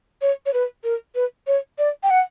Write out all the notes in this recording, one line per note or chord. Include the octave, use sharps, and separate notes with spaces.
C#5
C#5
B4
A#4
B4
C#5
D5
G5
F#5